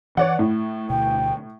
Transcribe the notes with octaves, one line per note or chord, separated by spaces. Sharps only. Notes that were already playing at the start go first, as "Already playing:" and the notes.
E3 C#5 D5 F#5
A2 A3
D2 B2 G5